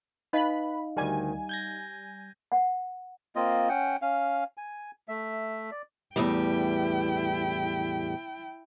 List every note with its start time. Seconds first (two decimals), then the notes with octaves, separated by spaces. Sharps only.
0.33 D#4 B4 D#5 F5 B5
0.97 D2 D#3 G3 G#5
1.49 G6 G#6 A#6
2.52 F#5
3.36 A#3 C4 F4 D#5
3.69 C#4 F#5 G5
4.02 C#4 F5
4.57 G#5
5.08 A3 E5
5.72 D5
6.16 E2 A2 G3 E4 G5